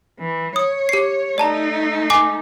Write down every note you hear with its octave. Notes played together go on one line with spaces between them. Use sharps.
E3
C#5 D#6
G4 C7
A3 D#4 D5 A5 A#5
G#5 D6 C7